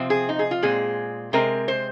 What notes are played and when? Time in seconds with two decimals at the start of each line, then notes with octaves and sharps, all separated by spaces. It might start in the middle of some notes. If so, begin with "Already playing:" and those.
Already playing: C3 F3 C4
0.10 G#4
0.29 D#4
0.39 G#4
0.51 F4
0.63 A#2 G#3 C4 G#4
1.33 C3 G#3 C4 A#4
1.68 C5